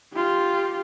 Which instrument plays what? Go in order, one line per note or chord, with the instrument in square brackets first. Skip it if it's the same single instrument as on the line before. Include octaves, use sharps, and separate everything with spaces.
[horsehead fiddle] F4 G4